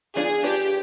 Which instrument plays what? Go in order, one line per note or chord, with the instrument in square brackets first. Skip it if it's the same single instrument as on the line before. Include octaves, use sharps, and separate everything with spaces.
[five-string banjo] D#3 B3 D4 F4 [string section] G#4
[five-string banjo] D4 F4 B4 D5 [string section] G4